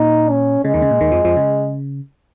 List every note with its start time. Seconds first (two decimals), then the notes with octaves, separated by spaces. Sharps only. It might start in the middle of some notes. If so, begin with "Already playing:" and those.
Already playing: A#2 D#4
0.30 C#4
0.64 C#3 G#3
0.74 D#2 D#3
0.82 C#3
0.91 A#2
1.01 D#2 D#3
1.12 F2 F3
1.25 F2 F3
1.37 C#3